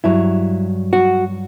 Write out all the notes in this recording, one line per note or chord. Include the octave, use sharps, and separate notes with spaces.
G2 F#3 E4
F#4